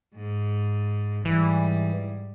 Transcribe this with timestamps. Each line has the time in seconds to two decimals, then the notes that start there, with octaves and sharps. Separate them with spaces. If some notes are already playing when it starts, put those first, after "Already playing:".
0.15 G#2
1.25 G#2 E3 G3